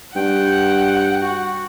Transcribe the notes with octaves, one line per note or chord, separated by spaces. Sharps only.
G2 F#5 G5
F#4